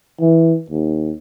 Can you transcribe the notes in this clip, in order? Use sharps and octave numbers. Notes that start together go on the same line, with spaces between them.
E3
D#2